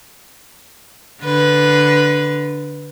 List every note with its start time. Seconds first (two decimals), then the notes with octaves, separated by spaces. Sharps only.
1.22 D3 B4